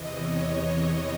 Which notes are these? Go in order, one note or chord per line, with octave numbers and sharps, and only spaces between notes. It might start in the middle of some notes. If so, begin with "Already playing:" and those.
Already playing: E2 C3 E3 D#5
C#5